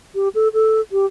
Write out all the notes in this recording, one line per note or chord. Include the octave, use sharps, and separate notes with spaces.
G4
A4
A4
G4